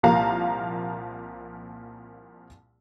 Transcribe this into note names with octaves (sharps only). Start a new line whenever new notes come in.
C2 A#2 F3 A#3 F5 A#5